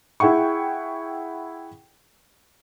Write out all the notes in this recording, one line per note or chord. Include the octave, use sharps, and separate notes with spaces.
E4 G#4 F#5 G5 C#6